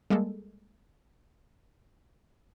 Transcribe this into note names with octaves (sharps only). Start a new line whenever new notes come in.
G3 G#3 A#3 A4